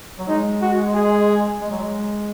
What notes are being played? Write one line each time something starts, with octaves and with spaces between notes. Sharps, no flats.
F#3
G#3 D#4
F#4
G#4
G#3
F#3
G#3